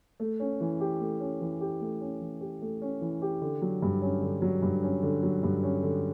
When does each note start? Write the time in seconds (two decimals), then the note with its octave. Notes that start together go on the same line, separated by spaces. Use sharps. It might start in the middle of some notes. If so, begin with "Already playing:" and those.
0.20 A3
0.40 C#4
0.61 E3
0.80 G4
1.00 A3
1.20 C#4
1.41 E3
1.61 G4
1.81 A3
2.01 C#4
2.21 E3
2.41 G4
2.62 A3
2.82 C#4
3.01 E3
3.22 G4
3.42 D3
3.62 F#3
3.82 G2
4.02 C#4
4.22 D3
4.42 F#3
4.62 G2
4.83 C#4
5.03 D3
5.23 F#3
5.43 G2
5.63 C#4
5.83 D3